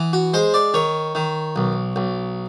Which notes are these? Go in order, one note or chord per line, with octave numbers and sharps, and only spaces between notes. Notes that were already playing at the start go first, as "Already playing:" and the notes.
Already playing: E3 B3
F#4
G#3 C5
D5
D#3 C#5
D#3
B1
B1